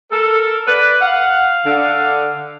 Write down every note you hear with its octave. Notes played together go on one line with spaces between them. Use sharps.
A4 A#4
B4 D5
F5 F#5
D3